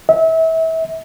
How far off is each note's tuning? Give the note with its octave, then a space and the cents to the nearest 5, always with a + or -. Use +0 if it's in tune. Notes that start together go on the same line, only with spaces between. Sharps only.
E5 -30